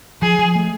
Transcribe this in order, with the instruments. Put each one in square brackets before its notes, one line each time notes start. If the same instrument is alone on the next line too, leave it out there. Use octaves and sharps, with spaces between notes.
[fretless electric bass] F3 [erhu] G#4
[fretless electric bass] F3
A3